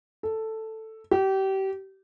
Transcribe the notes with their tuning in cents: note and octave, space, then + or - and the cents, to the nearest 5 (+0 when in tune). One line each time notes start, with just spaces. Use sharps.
A4 +5
G4 -30